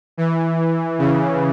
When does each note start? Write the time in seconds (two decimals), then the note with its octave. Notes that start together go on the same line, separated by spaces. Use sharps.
0.17 E3
0.99 C#3